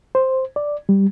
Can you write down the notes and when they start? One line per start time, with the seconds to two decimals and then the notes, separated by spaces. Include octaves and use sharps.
0.15 C5
0.56 D5
0.89 G3